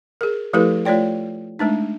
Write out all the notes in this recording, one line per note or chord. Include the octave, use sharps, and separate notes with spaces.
G#4 A#4
F3 A3 E4 G4 A4 B4
A3 F4 C#5 D5 G5
G#3 A3 D4 D#4